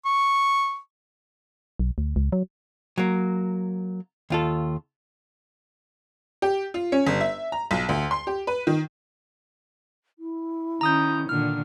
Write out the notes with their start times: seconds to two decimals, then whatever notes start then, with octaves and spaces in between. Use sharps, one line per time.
0.05 C#6
1.79 B1
1.98 D2
2.16 C#2
2.32 F#3
2.98 F#3 A#3
4.30 D#2 F4 A4
6.42 G4
6.74 F4
6.92 C#4
7.07 G1
7.20 E5
7.52 A#5
7.71 B1
7.89 D2
8.11 C6
8.27 G4
8.47 B4
8.67 D#3
10.19 E4
10.81 D#3 C#4 A#5 D#6 G6
11.29 A#2 D3 D#3 F6